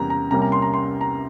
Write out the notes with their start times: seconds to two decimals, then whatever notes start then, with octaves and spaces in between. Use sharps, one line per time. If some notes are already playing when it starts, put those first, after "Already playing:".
Already playing: E2 C3 G3 A#3 C#4 A#5
0.10 A#5
0.31 C2 C3 G3 A#3 C#4 A#5
0.42 A#5
0.52 C6
0.62 A#5
0.74 C6
1.01 A#5